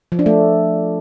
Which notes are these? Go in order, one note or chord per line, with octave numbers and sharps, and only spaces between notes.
F3
D4
A3